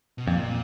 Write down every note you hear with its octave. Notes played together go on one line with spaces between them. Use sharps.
B2
F2 A#2